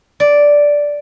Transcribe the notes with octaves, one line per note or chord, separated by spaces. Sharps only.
D5